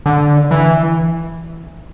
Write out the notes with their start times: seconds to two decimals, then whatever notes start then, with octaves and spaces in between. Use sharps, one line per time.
0.06 D3
0.51 E3